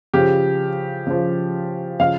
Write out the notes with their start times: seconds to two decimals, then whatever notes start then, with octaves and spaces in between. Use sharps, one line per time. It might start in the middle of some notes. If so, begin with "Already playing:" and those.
0.14 C#3 F3 G4
1.07 C#3 F3
2.00 C#3 F3 F5